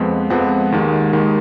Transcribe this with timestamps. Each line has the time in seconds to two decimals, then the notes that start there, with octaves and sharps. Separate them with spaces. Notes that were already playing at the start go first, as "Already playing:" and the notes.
Already playing: F2 F3 G#3 B3
0.30 F2 F3 G#3 B3 F#5
0.72 D#2 D#3 G#3
1.13 D#2 D#3 G#3